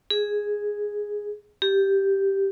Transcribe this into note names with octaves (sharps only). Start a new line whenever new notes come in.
G#4
G4